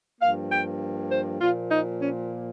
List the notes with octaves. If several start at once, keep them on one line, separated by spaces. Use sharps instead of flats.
G2 F3 A#3 F5
G5
C5
A#2 F3 A#3 F4
D#4
C#4